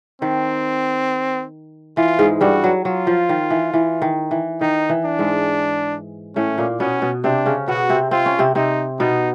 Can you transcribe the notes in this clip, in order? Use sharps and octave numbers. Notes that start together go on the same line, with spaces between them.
D#3 C4
E3 F4
G#2 G#3
G2 G3 F#4
F#3
F#3 F4
F3
D#3
E3
E3
D#3
E3
D#3 D#4
E3
D4
G#2 G#3
A2 A3 C#4
A#2 A#3
B2 B3 C#4
B2 B3
C3 C4 D4
C#3 C#4
B2 B3 F#4
C3 C4
C4 F4
C#4
C3 C4
C3 C4 D#4
B2 B3 D#4